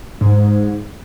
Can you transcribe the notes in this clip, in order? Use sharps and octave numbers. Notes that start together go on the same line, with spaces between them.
G#2